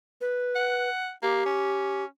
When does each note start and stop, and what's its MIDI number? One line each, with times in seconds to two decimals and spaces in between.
0.21 0.89 71
0.55 1.11 78
1.23 1.45 58
1.23 2.04 67
1.46 2.05 61